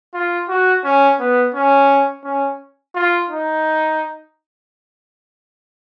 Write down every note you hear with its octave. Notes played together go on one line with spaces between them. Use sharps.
F4
F#4
C#4
B3
C#4
C#4
F4
D#4